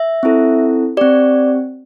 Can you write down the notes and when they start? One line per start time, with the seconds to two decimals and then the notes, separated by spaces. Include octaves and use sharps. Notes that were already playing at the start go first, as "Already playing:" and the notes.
Already playing: E5
0.23 C4 E4 A4
0.97 C4 G4 D5